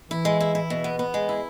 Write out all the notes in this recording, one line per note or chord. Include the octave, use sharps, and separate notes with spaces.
E3 E4
G#3
E4
E4
B2
B3
B3
G#3
E4